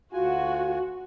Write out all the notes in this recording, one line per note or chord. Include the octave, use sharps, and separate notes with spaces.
D2 F4 F#4 G#5